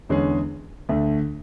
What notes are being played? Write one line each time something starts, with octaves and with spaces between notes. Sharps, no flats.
E2 D3 G#3 C#4 G#4
D2 D3 A3